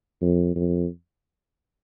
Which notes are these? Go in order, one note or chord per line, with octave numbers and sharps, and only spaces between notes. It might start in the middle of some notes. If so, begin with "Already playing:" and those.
F2
F2